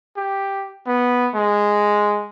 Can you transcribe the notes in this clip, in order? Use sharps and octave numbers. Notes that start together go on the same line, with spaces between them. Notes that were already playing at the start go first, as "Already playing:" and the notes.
G4
B3
G#3